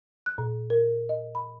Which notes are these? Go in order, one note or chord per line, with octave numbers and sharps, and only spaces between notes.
F#6
A#2
A#4
D#5
B5